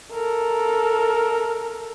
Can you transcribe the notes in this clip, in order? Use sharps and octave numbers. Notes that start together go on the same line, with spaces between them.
A4 A#4